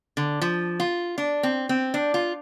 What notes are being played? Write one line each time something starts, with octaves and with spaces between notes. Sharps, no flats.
D3
F3
F4
D4
C4
C4
D4
F4